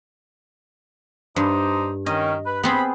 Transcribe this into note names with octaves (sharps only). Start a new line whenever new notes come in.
G2 D4 D#4 C5
D#3 C#4 D#5
B4
B3 C4 G#4 B5